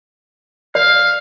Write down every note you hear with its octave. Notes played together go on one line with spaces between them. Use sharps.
D5 F5